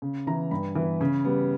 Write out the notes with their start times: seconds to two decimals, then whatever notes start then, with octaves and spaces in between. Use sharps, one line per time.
0.02 C#3
0.26 E3 B3 A#5
0.51 G2 B5
0.75 E3 B3
1.01 C#3
1.25 G3 B3